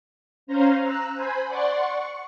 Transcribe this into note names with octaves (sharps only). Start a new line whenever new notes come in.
C#4 C5 F5 A#5 C6
A#5 E6 F#6
C5 G#5 B5
D5 F#5 C6 C#6
C#6